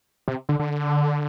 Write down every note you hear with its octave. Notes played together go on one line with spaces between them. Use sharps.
C3
D3
D3